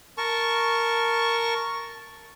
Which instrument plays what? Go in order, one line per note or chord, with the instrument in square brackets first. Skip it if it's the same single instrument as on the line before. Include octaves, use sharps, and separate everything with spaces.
[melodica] A#4 A5 C#6